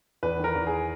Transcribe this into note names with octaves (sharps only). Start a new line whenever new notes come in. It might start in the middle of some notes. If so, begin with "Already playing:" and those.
E2 B4
D#3
A#4
E2
G#4